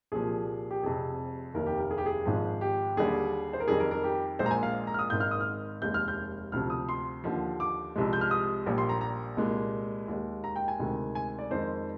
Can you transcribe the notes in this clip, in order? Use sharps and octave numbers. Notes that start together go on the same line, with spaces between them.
C2 A#2 F3 G#4
G4
F1 F2 C3 G#4
F1 D#2 D#3 A#4
G4
A#4
G#4
G4
G#4
G#1 G#2 F3
G4
D#2 D3 G3 G#4
C5
A#4
F2 D#3 G3 G#4
A#4
A#4
G4
A#1 A#2 G#3 C5
A#5
G#5
F5
A#5
F6
D#6
G#1 G#2 D#3 G#3 G6
F6
D#6
F6
F1 D#2 D#3 G#3 G6
F6
G6
D2 C3 F3 F6
D#6
C6
D#2 D3 F3
D6
C2 C3 F3 G#3
G6
F6
D#6
A#1 A#2 G3
C6
A#5
A#5
C2 A#2 G#3
D#2 D#3 G#3
A#5
G5
G#5
D2 C3 D#3 G#3
G#5
D5
F2 D#3 G#3 C5